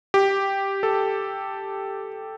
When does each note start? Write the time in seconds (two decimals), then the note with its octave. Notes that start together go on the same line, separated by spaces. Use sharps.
0.14 G4
0.83 A4